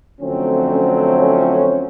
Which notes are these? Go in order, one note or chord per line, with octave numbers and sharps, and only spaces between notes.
F2 D3 F#3 A3 C4 C#4
C#4
C#4